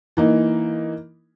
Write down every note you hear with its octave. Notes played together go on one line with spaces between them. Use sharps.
E3 A#3 D#4